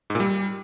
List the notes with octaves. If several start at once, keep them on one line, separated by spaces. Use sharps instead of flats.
G#2
A#2
G3